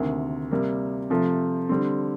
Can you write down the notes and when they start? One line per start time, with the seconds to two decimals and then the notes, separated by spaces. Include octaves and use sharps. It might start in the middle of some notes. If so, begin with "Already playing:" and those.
Already playing: D2 C3 D#3 A#3
0.51 C3 G3 A#3
1.10 C3 F3 A3
1.69 D3 G3 C4